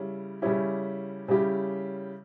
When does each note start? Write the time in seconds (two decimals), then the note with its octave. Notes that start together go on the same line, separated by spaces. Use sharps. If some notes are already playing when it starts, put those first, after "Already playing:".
Already playing: C#3 G3 C#4 E4
0.42 C#3 G3 C#4 E4 G4
1.28 C#3 G3 C#4 E4 G4